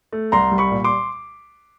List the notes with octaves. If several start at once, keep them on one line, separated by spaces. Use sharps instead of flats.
A3
C2 A#5 C6
G3
B5 C#6
A#2
C6 D6